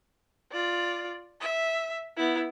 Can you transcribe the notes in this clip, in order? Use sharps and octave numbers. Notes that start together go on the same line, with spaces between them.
F4 D5
E5
B3 E4